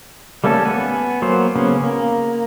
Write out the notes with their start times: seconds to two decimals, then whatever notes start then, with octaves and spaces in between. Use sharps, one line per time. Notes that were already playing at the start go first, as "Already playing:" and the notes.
0.44 G3 A3 A#3 C#4 A4
0.65 B3 F#5 G#5
1.22 F#3 A#3 C5
1.56 C#3 A#3 B3 C#4
1.84 A#3